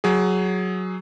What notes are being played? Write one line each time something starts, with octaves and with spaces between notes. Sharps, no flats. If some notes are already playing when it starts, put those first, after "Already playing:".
F#3 G#4